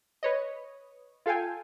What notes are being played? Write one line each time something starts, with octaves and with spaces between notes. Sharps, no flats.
B4 C#5 D#5
F4 A4 F5 G5 G#5